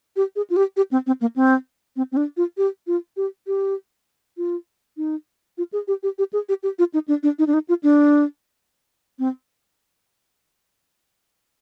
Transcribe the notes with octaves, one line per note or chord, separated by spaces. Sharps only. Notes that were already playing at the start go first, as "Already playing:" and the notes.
G4
G#4
F4
G4
G4
C4
C4
A#3
C4
C4
C4
D4
F4
G4
F4
G4
G4
F4
D#4
F4
G#4
G4
G4
G4
G#4
G4
G4
F4
D#4
D4
D4
D#4
D4
D#4
F4
D4
C4